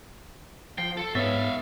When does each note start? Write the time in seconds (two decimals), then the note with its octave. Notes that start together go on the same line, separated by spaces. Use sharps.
0.78 F3 G5 C7
0.97 A4
1.15 G#2 B3 C#5 E5 F5 A6